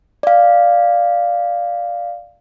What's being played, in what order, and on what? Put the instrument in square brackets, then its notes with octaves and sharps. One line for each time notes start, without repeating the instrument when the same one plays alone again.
[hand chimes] D5 F5